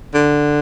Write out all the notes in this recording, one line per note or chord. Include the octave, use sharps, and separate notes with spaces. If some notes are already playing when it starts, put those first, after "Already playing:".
D3